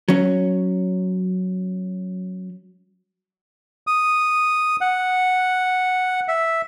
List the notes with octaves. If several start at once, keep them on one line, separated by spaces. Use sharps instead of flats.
F#3 C#4
D#6
F#5
E5